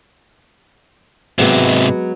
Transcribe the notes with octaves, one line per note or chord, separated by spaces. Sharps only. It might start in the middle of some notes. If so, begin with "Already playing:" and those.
G#2 C3 F#3 G#3 B3